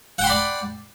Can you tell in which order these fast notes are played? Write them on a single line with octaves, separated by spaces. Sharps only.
F#5 G5 C6 B5 D5